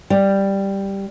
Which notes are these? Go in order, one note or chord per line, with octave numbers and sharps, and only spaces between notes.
G3